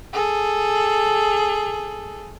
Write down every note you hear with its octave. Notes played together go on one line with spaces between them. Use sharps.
G#4 A4